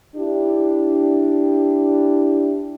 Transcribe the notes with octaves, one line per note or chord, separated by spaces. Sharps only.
D4 E4 G4